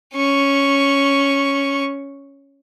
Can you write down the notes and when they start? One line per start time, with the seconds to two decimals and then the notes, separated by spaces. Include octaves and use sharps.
0.14 C#4 C#6